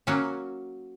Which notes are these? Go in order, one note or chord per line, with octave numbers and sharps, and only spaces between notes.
F#3 A#3 C#4 F#4